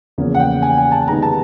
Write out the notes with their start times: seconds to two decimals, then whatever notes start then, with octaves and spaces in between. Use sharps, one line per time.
0.18 E2 C#3 F3 A#3
0.35 F#5
0.40 G5
0.62 G#5
0.78 G#5
0.92 A5
1.07 C3 D#3 G#3 B3 D#4 A#5
1.22 A5